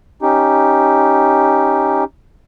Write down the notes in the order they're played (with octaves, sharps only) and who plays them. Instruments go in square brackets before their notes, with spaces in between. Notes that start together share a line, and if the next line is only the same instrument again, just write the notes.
[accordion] C#4 D#4 G4